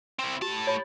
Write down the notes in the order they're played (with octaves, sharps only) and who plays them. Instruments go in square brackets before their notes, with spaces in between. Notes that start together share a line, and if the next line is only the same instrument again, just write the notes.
[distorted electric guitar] C4 E4
[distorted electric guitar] A2 A5 [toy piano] G4
[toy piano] C#5 B5